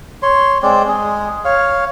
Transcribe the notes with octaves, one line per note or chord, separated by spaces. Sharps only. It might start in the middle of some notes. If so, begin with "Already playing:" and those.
C#5 C6
G#3 C4 D5
G#3 G#4
C#5 F5